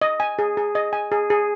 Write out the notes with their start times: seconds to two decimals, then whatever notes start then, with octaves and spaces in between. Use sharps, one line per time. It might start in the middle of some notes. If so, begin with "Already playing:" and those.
0.01 D#5
0.20 G#5
0.39 G#4
0.57 G#4
0.75 D#5
0.93 G#5
1.12 G#4
1.30 G#4